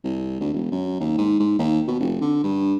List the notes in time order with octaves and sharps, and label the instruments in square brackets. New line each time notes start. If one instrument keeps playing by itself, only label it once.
[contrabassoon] C2
D2
E1
F#2
D#2
G#2
G#2
D#2
B2
F1
D3
G2